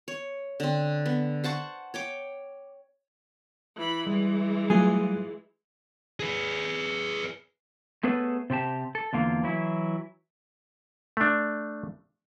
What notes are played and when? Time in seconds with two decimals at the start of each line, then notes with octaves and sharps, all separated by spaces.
0.08 C#5
0.60 D3 C4
1.06 B3
1.44 C5 F#5 A5 C#6
1.94 C#5 G5 D6
3.76 E3 B5
4.07 E3 G3 G#3
4.70 F#3 A3 F4 G#4
6.20 G#4 B4
8.03 A3 B3 G#4 A4 B4 C#5
8.50 C3 C4 G4 A5
8.95 A4
9.13 E2 D3 A#3 F4
9.43 E3 F#3 E4
11.17 A3 D4